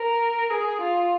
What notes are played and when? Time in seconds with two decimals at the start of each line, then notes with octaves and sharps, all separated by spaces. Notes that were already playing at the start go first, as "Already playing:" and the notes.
Already playing: A#4
0.51 G#4
0.81 F4